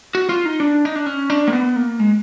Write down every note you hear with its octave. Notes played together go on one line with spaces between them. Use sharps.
F#4
F4
D#4
D4
D#4
D4
C#4
D4
A#3
B3
A#3
G#3